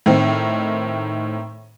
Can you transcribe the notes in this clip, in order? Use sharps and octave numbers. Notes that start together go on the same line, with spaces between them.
A2 D#3 C4